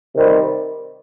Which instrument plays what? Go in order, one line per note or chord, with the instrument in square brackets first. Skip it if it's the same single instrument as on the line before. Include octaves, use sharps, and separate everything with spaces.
[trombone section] C3 D#3 G3 C4